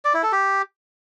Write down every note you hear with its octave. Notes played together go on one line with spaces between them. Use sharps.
D5
E4
A4
G4